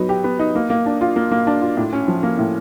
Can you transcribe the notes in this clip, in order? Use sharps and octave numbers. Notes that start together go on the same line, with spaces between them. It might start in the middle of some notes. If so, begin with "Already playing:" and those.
Already playing: F#3 B3 D#4
G4
B3
D#4
A#3
A#3
D4
F4
A#3
A#3
D4
F4
A2
C#4
F3
A#3
A2